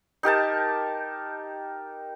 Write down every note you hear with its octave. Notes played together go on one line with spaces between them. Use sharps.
D#4 G4 A#4 A5